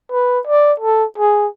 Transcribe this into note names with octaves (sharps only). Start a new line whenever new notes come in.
B4
D5
A4
G#4